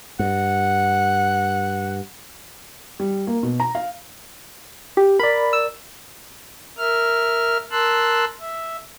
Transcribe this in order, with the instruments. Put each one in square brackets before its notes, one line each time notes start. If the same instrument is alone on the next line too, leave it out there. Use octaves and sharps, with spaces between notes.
[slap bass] G2 [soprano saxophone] F#5
[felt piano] G3
A#3
B2
A#5
F5
[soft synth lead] G4
[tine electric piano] A#4 D5 [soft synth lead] B5
[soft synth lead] E6
[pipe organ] A#4 E5 F6
A#4 A5 C6 E6 F#6
E5